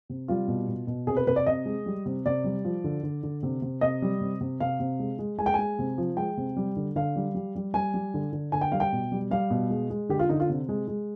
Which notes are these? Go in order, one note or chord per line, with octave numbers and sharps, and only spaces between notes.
C3
G3 F4
B2
B2
B2
C3 G#4
B4
C3 B4
D5
C3 D#5
G#3
G3
C3
C3 D5
G3
F3
D3
D3
D3
C3
C3
C3 D#5
G3
C3
C3
C3 F5
C3
G#3
G#3
G#3 G#5
G5
G#3 G#5
C3
F3
G#3 G5
C3
G3
D3
D3 F5
G3
G3
G3
G3 G#5
G3
D3
D3
D3 G#5
G5
G3 F5
G5
B2
G3
G3 F5
B2
G#3
G#3
D3 G4
F4
D3 D#4
F4
C3
G#3
G#3